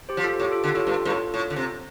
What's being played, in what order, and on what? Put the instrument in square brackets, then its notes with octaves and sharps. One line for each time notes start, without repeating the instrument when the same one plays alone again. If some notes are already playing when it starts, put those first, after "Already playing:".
[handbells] G4 C5
[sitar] F3
[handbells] F4 A4
[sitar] A2 [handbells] G4
[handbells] F4 A4
[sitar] D3 [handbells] G4
[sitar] A2 [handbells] F4 A4
[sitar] G2
G2
A2
A2
D3
C3